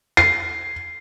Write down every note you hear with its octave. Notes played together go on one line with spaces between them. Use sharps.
C7